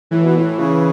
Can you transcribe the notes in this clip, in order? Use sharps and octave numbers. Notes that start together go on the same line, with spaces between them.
A2 E3
B2
A2
C#3